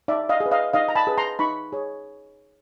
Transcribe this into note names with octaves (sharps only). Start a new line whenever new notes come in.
D#4 D5 E5
D#5 F5
G#4
B4
D#5 F5
D#4 D#5 F5
A#5
A5 B5
G#4 B4
A#5 C6
D#4 B5 C#6
G#4 C#5